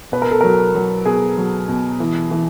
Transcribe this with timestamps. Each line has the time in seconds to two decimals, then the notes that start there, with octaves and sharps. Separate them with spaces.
0.12 B2 B4
0.22 A#4
0.31 A4
0.41 F#3 A#4
0.75 F#3
1.06 B2 G#4
1.38 F#3
1.69 B2
2.00 E3
2.31 E3